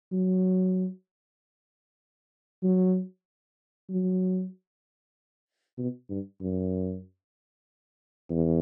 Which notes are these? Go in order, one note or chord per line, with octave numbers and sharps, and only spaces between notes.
F#3
F#3
F#3
B2
G2
F#2
E2